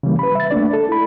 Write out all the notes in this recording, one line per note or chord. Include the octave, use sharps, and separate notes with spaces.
C#3 E3 G3 A#3
B4 B5
E5 A6
A3 A#3 D4 D5
A4
E4 B5